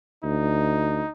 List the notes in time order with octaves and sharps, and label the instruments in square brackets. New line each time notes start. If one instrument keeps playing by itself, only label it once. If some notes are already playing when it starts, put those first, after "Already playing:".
[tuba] D2 [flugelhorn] D#4